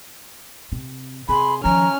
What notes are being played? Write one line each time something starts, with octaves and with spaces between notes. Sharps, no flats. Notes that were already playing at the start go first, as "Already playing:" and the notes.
C3
C3 G#4 B5 C6
D#3 F3 C#4 A#5 F6